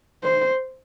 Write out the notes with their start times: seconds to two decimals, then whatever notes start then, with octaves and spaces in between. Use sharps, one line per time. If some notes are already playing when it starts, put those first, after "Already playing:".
0.23 C5